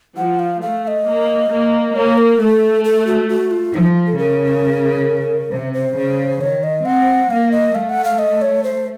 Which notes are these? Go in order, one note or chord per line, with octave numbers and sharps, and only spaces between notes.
F3 F#5
F5
A3 F5
F5
D#5
A#3
A#3
A#3 C#5
A#4
A3 A4
A4
F#4
F#4
F4
F3 D#4
A4
C#3 A#4
C3 C5
C5
C#3
D#3 C#5
D#5
C4 F#5
A#3 F5
D#5
A3 F5
F#5
F5
D#5
C#5
C5